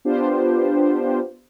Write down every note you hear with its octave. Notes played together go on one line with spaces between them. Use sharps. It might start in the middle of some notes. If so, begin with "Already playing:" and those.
B3 D4 F4 G4 C5